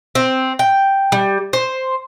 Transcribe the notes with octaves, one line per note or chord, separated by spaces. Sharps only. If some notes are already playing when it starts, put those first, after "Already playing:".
C4
G5
G3
C5